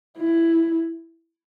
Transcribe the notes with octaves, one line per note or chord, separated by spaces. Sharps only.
E4